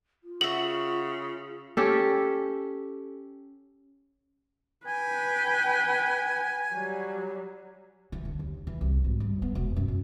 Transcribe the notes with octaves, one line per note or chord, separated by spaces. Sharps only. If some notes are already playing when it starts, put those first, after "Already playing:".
F4
C#3 F#4 E5 F#7
C#4 G4 A4
B4 G5 G#5
F#3 G3
E3
D3
D#2
E3
C2
G#1
G2
B3
E1
F#2
F#2